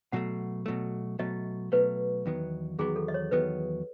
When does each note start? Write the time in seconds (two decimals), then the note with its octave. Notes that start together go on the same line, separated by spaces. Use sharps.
0.12 B2 F#3 A3 F#5
0.66 B2 F#3 A3
1.19 B2 F#3 A3 D#5
1.72 B2 F#3 A3 B4
2.26 E2 D#3 F#3 B3
2.79 E2 D#3 F#3 B3 G#4
2.96 A4
3.08 D#5
3.14 C#5
3.31 E2 D#3 F#3 B3 B4